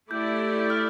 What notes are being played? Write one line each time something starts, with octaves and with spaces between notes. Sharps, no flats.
A3 E4 G4 D5 G6
F6